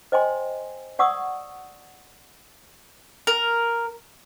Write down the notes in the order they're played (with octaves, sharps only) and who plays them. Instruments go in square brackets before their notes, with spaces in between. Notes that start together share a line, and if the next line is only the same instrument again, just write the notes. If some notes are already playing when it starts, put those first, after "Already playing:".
[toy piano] C5 D#5 G5 G#5 C6
D5 F#5 C#6 D#6 E6
[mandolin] A#4